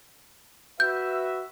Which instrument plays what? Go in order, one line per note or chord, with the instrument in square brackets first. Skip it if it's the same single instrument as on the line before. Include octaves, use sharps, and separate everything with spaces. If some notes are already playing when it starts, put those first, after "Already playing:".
[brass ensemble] F#4 B4 E5 [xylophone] G6